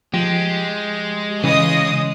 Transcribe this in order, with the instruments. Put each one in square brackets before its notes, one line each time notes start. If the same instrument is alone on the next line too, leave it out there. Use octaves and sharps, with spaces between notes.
[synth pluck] F3 [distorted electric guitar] G#3 [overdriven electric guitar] G4
[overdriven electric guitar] C#3 [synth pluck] E3 [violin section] D#5 D#6